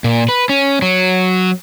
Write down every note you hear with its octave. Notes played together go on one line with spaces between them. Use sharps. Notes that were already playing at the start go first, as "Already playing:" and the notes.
A#2
B4
C#4
F#3